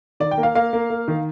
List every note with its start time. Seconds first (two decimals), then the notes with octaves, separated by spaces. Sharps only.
0.20 D#3 D5
0.31 G5
0.38 A#3
0.43 F5
0.55 A#3 F5
0.73 A#3
0.90 A#3
1.08 D#3